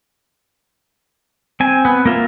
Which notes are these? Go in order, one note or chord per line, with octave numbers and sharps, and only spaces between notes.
C4 G#5
B3
A#3 F4 E5